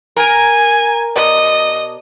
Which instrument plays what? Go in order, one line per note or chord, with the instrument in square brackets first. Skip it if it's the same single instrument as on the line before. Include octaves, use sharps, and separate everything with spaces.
[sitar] A#4 [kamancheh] G#5
[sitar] B2 D5 [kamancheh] D#5